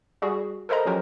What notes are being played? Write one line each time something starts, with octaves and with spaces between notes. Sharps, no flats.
G3 F#4 G#4
A4 A#4 C5 D#5 A#5
F3 F#3 C#4 G4 A#4 C5